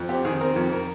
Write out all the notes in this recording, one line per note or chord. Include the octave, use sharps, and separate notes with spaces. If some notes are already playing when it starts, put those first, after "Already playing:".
Already playing: F2
C4 G4
D#3 G#4
C4 A#4
F2
A#4